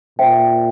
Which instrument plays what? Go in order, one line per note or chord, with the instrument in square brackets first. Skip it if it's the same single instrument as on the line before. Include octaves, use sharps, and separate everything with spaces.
[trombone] A#2 [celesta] C5 E5 G5